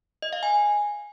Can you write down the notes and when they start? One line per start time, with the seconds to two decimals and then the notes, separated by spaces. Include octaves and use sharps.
0.22 D#5
0.33 F5
0.43 G#5